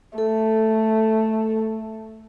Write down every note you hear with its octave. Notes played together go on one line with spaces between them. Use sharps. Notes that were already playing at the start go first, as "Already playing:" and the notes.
A3 A4